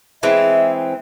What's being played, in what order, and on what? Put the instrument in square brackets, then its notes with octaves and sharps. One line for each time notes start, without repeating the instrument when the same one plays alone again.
[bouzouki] E3 G#3 C4 [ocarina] E5